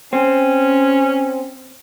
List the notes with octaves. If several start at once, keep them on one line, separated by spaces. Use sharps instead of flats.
C4 C#4